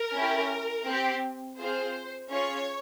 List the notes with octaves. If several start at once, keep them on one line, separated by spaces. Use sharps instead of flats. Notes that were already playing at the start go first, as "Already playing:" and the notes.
Already playing: A#4
C#4 E4 G4
C4 G4
C4 F4 G#4 C5
C#4 F4 G#4 C#5